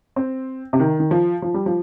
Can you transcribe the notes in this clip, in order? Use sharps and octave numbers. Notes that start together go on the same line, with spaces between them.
C4
C3
D#3
D#3
F3
F3
G3
F3